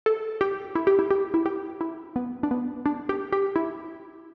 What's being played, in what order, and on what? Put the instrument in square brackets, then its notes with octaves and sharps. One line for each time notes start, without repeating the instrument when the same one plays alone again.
[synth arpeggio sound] A4
G4
E4
G4
E4
G4
E4
G4
E4
B3
D4
B3
D4
G4
G4
E4